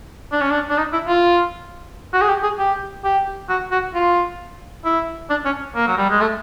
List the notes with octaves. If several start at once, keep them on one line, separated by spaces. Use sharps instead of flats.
D4
C#4
D4
D4
D#4
E4
F4
F#4
G#4
G4
G#4
G4
G4
F#4
F#4
F4
E4
D4
C#4
A#3
F#3
G3
G#3
A3